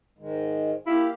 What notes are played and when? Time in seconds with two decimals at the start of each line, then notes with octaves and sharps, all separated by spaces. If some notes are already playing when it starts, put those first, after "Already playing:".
0.18 G#2 D#3 G#3
0.87 A#3 E4 G4 F5